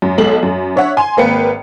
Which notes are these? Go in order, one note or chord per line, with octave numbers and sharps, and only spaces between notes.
F#2
B1 G#3 A4 F#7
F#2
D4 C#5 E5 F#5
G#5 C6
G#1 A#3 B4 G5 C#7